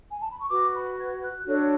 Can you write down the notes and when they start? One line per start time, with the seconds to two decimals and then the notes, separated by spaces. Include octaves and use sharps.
0.11 G#5
0.20 A5
0.30 B5
0.40 C#6
0.50 F#4 B4 D6
0.74 B5
0.98 G#6
1.22 F#6
1.46 D4 F#4 A4 C#5 F#6